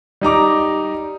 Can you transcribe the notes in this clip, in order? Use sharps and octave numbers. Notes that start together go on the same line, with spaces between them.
G3 D#4 A#5 D6